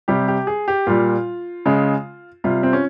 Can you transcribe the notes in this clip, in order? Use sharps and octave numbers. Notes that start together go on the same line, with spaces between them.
C3 G3 G4
G4
G#4
G4
A#2 G3 F4
C#3 G#3
C3 G3 F4
C4
C#4